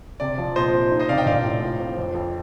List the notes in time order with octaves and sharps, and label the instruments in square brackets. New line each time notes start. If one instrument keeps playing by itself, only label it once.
[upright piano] C3 [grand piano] D5
[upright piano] F3
[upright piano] A#2 [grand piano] C5 D#5
[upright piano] C4
D#4
[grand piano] C5 D#5
[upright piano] C3 [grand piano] D5 F5
[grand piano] D#5 G5
[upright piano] A#1 [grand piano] D5 F5
[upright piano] A2
F4
C4
F2
F2